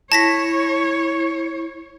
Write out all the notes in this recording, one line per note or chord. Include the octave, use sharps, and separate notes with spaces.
E4 C#5 A5 A#6 B6